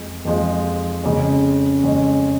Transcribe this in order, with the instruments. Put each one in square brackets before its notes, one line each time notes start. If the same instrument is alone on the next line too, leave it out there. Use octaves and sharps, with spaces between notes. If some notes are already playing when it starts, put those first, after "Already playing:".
Already playing: [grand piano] F2 F3 G#3
F2 F3 G#3
F2 C#3 G#3 C#4
F2 C#3 G#3 C#4